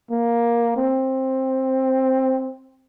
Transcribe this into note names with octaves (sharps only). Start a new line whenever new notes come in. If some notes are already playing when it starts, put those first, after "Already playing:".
A#3
C4